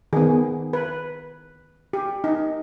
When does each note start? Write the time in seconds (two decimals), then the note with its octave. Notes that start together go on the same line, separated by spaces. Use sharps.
0.13 D#3 B3 G#4
0.73 B4
1.93 G4
2.24 D#4